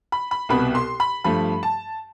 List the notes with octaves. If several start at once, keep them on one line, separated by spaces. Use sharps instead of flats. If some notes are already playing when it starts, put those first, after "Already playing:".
B5
B5
C2 B2 B3 B5
C6
B5
G2 F3 A3 B5
A5